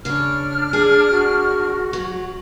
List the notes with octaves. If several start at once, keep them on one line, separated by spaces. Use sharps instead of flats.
C#3 D4 C#5 F6
G#4
F#4
F#3